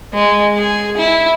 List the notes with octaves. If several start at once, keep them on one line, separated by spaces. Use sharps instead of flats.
G#3
G#4
E4